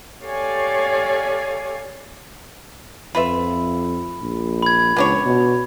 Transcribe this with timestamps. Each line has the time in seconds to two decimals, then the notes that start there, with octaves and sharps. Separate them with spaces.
0.24 G4 A4 C#5 D5 F5 G#5
3.15 F2 F4 B4 E5 B5
4.22 A#1
4.63 B5 G#6
4.97 C#2 B3 D4 C#5
5.26 B2